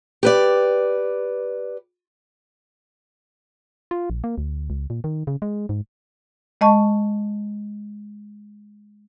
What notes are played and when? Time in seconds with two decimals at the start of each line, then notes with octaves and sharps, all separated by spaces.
0.23 G4 B4 D5
3.91 F4
4.10 A#1
4.24 A#3
4.38 D2
4.70 C#2
4.90 A#2
5.04 D#3
5.27 C#3
5.42 G#3
5.69 G#2
6.61 G#3 D#5 A5 C#6